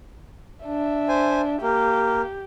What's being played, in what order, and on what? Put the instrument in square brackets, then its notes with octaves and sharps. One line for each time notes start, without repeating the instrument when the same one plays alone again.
[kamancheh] D4 E5
[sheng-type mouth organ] C5 G#5
[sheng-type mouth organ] A#3 [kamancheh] G4